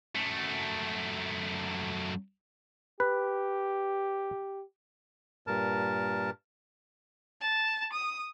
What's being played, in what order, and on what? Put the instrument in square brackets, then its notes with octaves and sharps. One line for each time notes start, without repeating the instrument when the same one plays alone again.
[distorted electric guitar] F#2 A3
[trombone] G4 [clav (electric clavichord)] B4
[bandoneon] G2 A#2 A#4 A5
[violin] A5
D#6